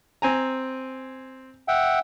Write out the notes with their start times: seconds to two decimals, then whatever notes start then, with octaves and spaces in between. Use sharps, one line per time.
0.22 C4 G#5 A#5
1.68 E5 F#5 G5